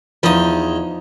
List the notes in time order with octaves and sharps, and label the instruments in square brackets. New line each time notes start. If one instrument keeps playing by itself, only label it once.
[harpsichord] E2 D#5 [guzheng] F3 D#4